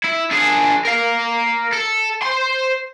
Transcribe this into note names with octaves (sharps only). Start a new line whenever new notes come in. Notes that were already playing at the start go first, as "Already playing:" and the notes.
E4
D4 G#4
A#4 F5
A4
C5 C6